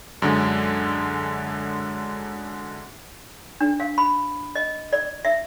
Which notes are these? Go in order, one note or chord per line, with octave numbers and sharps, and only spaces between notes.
F#2 D3 G#3
D4
F5
B5
D#5
D5
E5